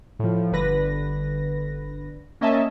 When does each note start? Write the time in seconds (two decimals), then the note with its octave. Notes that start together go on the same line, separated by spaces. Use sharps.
0.19 A2 F3
0.52 G1 D3 B4 A#6
2.41 A#3 C#4 D#5 E5 G#5 A5